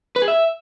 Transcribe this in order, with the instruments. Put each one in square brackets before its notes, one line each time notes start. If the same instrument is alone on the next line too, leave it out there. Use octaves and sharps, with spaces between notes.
[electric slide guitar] B4
G#4
E5